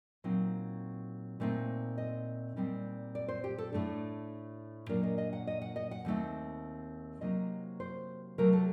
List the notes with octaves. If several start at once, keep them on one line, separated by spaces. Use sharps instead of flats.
A#2 F#3 C4 D#4
A#2 A3 C4 D#4
D#5
A#2 G3 C4 D#4
D5
C5
G4
A4
A2 A3 D4
A#2 F#3 A#3 D4 A#4
D#5
D#5
F#5
D#5
F#5
D#5
F#5
D#2 D3 A3 C4 D#4
C3 F#3 A#3 D#4 D#5
C5
C3 F#3 A3 A#4
A4